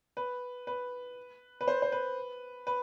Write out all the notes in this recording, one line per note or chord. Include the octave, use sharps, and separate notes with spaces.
B4
B4
B4
C5
C5
B4
B4